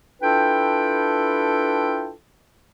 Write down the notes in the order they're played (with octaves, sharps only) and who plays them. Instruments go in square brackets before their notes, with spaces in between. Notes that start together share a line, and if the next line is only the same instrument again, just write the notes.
[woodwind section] D4 E4 F4 A4 B4 G5